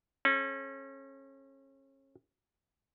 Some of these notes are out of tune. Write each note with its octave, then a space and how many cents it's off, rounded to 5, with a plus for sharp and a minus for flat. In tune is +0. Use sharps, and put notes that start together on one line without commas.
C#4 -35 A4 -35